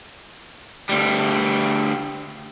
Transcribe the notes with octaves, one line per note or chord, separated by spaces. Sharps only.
D2 G3